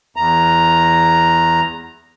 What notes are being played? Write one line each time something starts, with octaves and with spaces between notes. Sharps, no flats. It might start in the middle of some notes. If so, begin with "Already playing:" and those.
E2 A#5